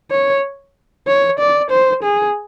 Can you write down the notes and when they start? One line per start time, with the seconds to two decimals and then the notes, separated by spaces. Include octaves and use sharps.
0.12 C#5
1.08 C#5
1.40 D5
1.71 C5
2.03 G#4